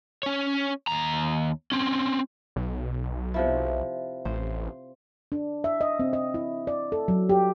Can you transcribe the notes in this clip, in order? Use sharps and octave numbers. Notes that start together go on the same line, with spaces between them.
C#4 C#5
D#2 A#5
C4 C#4
B1
C3 F3 E4
A1 C5
D4
E5
D#5
C4
D#5
E4
D5
A4
F#3
G4